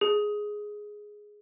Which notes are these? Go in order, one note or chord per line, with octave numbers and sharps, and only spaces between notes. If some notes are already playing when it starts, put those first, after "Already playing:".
G#4